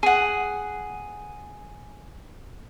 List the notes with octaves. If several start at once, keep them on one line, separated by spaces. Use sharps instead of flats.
G#4 F#5